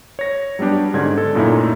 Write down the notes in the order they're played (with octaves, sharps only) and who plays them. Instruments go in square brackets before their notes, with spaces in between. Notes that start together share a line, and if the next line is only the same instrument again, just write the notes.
[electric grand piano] C#5 A#6
F#3 G3 B3 D4 G4
G#2 D3 C#4 D5 G#6
A4
F#2 A#2 A3 D#4 E4